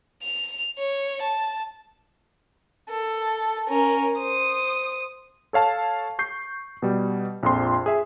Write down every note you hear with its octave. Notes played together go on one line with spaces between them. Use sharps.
F7
C#5
A5
A4
C#4 A#4
C5 D#6
A4 C#5 F5 A5
C#6 G6 C7
B2 G3
A#1 F2 C6
G#4 E5